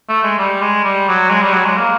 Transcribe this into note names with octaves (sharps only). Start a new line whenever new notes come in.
A3
G#3
G3
G#3
G3
F#3
G#3
G3
F#3
G#3
A#3